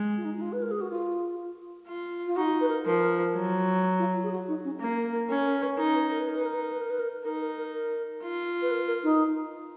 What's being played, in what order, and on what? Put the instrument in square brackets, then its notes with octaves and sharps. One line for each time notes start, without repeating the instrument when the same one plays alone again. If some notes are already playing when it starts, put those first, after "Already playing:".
Already playing: [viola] G#3
[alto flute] F4
D#4
D#4
F4
B4
A#4
G#4
F#4
F4
[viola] F4
[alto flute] F4
[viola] D#4 [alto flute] F#4
[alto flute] B4
A#4
[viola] F3 [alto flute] A#4
[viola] F#3
[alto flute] F4
G#4
F#4
D#4
C#4
[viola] A#3
[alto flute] A#4
A#4
[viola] C#4 [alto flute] A#4
[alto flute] A#4
B4
[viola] D#4 [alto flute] A#4
[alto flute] B4
A#4
B4
[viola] D#4 [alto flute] A#4
[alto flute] B4
A#4
B4
A#4
B4
A#4
B4
A#4
[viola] D#4 [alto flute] A#4
[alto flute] A#4
A#4
A#4
[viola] F4
[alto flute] B4
A#4
A#4
D#4